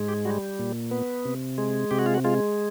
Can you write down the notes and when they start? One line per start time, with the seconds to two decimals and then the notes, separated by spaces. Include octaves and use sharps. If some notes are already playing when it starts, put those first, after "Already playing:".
Already playing: G#2 G#3
0.08 G4
0.25 G3 F#4
0.59 A#2
0.91 B3
1.25 C3
1.58 G#3
1.91 C3 G4
1.99 F#4
2.06 F4
2.15 F#4
2.24 G#3 F4